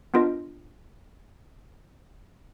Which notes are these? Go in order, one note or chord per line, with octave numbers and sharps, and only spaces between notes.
B3 D4 F4 A#4 D#5